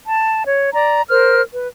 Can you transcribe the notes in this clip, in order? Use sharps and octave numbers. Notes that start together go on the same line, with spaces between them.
A5
C#5
D5 A#5
A#4 C5 F6
B4